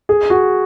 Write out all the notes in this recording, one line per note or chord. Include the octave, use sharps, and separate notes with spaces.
G#4
F#4